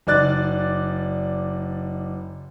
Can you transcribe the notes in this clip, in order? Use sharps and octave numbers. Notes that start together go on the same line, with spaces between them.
F#1 D#4 D5 F#6 A6